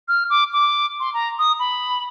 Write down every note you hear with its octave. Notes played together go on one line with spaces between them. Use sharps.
F6
D6
D6
C6
A#5
D#6
B5